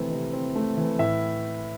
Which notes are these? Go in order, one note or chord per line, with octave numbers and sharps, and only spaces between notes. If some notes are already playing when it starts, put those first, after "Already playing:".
Already playing: C3 E3 A3 C4
C3
C4
A3
E3
A2 E5